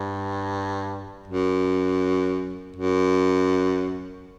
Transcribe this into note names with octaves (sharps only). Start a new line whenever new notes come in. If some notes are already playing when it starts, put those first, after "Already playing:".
Already playing: G2
F#2
F#2